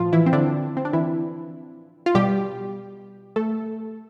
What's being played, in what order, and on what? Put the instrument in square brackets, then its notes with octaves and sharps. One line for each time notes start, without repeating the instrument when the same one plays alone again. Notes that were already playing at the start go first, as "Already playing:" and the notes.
Already playing: [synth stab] A2 E3 F3 F4
E3 E4
C4
D3 D4
C4
D4
E3 E4
F4
B2 G3 G4
A3 A4